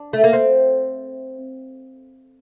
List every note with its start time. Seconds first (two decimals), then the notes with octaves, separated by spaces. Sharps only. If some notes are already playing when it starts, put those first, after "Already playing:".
Already playing: D4
0.13 A3
0.24 A#3
0.33 C4